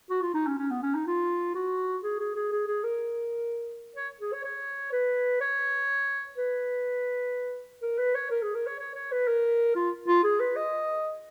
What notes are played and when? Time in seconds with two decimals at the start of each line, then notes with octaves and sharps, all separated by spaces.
0.10 F#4
0.22 F4
0.34 D#4
0.47 C#4
0.58 C#4
0.70 B3
0.83 C#4
0.94 D#4
1.07 F4
1.55 F#4
2.03 G#4
2.19 G#4
2.35 G#4
2.52 G#4
2.67 G#4
2.84 A#4
3.96 C#5
4.20 G#4
4.32 C#5
4.44 C#5
4.92 B4
5.41 C#5
6.37 B4
7.82 A#4
7.98 B4
8.15 C#5
8.30 A#4
8.42 G#4
8.54 A#4
8.67 C#5
8.79 C#5
8.95 C#5
9.11 B4
9.27 A#4
9.75 F4
10.07 F4
10.23 G#4
10.40 B4
10.56 D#5